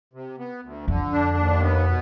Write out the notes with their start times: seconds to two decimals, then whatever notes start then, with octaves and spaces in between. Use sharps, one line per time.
0.13 C3
0.38 B3
0.63 D2
0.87 F2 D3
1.12 D4
1.37 D#2
1.61 B3
1.86 B2